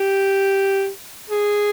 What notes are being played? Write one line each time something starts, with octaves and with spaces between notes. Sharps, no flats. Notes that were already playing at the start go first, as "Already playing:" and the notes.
Already playing: G4
G#4